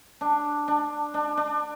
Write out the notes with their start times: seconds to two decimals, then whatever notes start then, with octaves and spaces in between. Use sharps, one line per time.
0.21 D4
0.68 D4
1.14 D4
1.37 D4